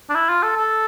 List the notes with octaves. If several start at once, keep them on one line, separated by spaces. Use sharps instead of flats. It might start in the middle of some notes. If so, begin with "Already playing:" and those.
D4
E4
F4
A4
A4